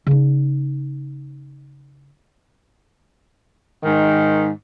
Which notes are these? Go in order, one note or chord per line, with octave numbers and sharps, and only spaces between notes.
C#3 D#4
G#2 D#3